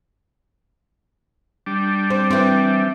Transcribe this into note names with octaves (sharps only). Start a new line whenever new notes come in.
G3 D4
C4
E3 C4